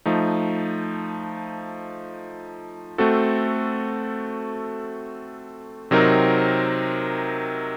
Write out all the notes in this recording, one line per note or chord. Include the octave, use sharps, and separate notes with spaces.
F3 A3 D#4
A3 C4 F#4 A4
C3 F#3 C4 D#4 A#4